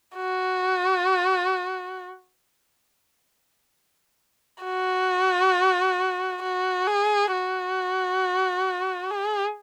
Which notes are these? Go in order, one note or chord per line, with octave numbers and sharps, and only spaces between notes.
F#4
F#4
F#4
G#4
F#4
G#4